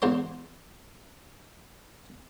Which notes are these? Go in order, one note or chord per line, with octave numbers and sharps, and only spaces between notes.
E2 G#2 C5 C6